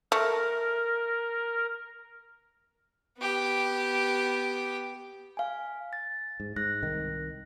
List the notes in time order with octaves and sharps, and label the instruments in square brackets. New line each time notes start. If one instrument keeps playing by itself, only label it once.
[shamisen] A3 [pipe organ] A#4
[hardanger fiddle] B3 G4
[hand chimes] F5 G#5
A6
[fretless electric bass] G#2
[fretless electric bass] G#2 [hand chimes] F#6 A#6
[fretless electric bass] C2 D#3